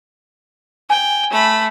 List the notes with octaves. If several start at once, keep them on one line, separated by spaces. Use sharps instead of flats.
G5 G#5
A3 B5